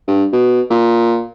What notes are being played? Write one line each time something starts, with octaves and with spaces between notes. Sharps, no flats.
G2
B2
A#2